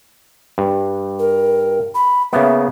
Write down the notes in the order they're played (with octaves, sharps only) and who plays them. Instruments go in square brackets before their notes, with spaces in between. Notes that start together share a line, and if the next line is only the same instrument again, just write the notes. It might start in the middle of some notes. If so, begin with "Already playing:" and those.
[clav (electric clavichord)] G2
[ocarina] A#4
B5
[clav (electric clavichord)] C#3 A#3 B3 [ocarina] E5